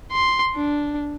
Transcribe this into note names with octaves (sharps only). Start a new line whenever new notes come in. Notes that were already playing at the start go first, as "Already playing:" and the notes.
C6
D4